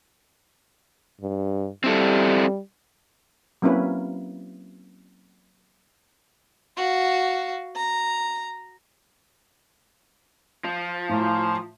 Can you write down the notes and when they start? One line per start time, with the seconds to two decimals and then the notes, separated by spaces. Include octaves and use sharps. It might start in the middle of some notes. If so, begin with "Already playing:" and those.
1.21 G2
1.84 G3 C4 E4 A4
3.62 F#3 A#3 C4 C#4 E4 B4
6.77 F#4 F5
7.76 A#5
10.65 F3
11.09 A2 A#3 C#4 C5